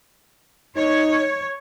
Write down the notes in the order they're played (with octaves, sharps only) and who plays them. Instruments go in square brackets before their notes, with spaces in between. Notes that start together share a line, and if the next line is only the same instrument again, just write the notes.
[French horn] D#4 [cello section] C#5